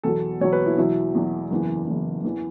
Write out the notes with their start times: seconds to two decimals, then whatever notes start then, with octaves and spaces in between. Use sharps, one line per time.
0.03 E2 B2 F#3 A4
0.41 E2 B2 F#3 C#5
0.53 B4
0.66 E4
0.78 E2 B2 F#3 E4
1.15 E2 B2 F#3
1.51 F#1 E2 E3
1.87 F#1 E2 E3
2.24 E2 E3